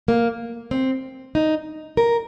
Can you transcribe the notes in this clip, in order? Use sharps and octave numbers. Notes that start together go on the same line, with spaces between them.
A#3
C4
D#4
A#4